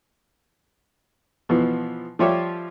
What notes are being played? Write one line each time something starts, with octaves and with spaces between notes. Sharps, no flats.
B2 E3 F3 B3
F3 G3 F4 G4 C#5 E5